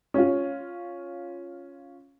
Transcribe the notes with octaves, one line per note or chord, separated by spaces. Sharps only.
C#4 F4